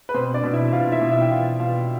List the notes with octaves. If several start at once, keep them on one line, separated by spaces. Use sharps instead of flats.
B4
B2 C4 C5
D4 D5
B2
E4 E5
B2 F4 F5
E4 E5
B2
E4 E5
G5
B2 F4 F5
B2 F4 F5